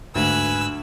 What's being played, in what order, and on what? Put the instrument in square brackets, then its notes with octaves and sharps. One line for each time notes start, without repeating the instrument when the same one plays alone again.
[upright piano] D2 [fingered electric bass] G#2 [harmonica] B4 G#5 [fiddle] E6 F#6